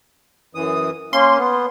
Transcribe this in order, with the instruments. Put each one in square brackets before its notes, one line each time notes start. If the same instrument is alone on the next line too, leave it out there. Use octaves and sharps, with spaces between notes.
[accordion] F#2 E3 D#6
[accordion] A#3 C#4 [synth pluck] C6
[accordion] B3